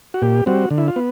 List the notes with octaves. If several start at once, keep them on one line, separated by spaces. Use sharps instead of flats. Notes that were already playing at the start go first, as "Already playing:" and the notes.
F#4
A#2 G4
G3 C4 F#4
D3
E4
F4
B3